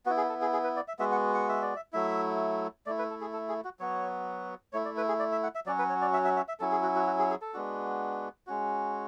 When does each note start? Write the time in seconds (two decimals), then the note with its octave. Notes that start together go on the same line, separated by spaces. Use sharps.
0.06 B3 F#4
0.10 E4
0.17 G#4
0.29 A4
0.41 G#4
0.53 G#4
0.64 B4
0.76 D5
0.88 E5
0.99 G#3 B3 F#4 E5
1.12 F#5
1.34 F#5
1.49 E5
1.62 D5
1.76 E5
1.93 F#3 A3 E4 E5
2.86 A3 E4 D5
2.99 B4
3.10 A4
3.21 G#4
3.33 A4
3.49 G#4
3.64 F#4
3.80 F#3 B3 F#4 C#5
4.73 A3 E4 C#5
4.85 D5
4.97 B4
5.08 G#4
5.19 D5
5.32 E5
5.43 F#5
5.55 E5
5.66 F#3 C#4 F#4 D5
5.79 B4
5.89 C#5
6.01 D5
6.13 E5
6.25 E5
6.37 E5
6.48 E5
6.60 F#3 C#4 E4 A4
6.72 G#4
6.83 F#4
6.95 F#4
7.07 F#4
7.19 G#4
7.30 G#4
7.41 A4
7.54 G#3 B3 D4 F#4
8.47 G#3 C#4 F#4